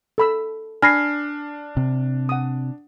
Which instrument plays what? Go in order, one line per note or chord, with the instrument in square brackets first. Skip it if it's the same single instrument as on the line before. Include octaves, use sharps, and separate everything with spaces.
[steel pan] A4 B5 E6
[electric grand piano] D4 [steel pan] G#5 B5 [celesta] F6 A#6 C7
[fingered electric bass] C3
[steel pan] F#5 D#6